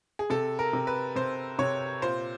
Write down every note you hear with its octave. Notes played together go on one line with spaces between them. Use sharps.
G#4
C3 A4
A#4
C3
B4
C3 C5
C3 C#5
A#2 C5